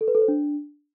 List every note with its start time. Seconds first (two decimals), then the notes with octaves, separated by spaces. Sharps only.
0.01 A4
0.08 B4
0.15 A4
0.21 C5
0.28 D4